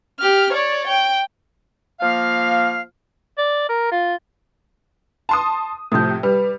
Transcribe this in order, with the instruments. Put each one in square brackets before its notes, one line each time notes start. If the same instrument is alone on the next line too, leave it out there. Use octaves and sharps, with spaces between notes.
[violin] G4 F6
C#5 D5
G5
[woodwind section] F3 A#3 F5
[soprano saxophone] D5
A#4
F4
[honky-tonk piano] A5 C6 D#6
[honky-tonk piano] A2 C3 F3 [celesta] D#6 G6
[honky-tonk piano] G3 [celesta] B4